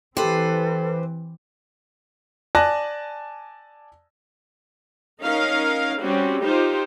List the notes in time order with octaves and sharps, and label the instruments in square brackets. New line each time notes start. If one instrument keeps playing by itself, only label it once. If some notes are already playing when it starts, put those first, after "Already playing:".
[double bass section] E3 C4 [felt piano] G4 [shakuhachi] A4 [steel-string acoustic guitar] B4 C5
[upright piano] D5 G#5 A5 F#6 A#6
[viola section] C#4 D#4 A#4 F5
G3 C4 C#4 F#4
D#4 F4 G4 C5